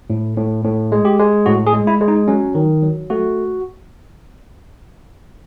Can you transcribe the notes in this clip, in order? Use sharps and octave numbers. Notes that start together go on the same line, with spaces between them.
A2
A2
A2
G#3
G4
G#3
A2 F#4
G#4
G#3
E4
G#3
D#4
F#3 C#4
D#3
F#3
A3 F#4